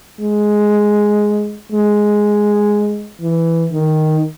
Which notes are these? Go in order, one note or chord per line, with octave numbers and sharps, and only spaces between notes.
G#3
G#3
E3
D#3